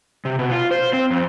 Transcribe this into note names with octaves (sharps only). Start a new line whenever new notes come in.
C3
B2
F4
C5
C4
F2